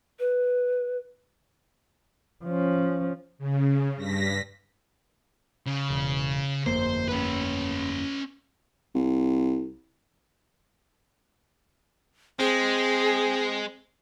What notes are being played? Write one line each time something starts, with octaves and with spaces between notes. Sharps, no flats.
B4
F3 C#4
C#3
G2 A#6 B6
C#3
E1
G1 F2 A#3 C5
C#4 B4
C2
G#3 C4 G#4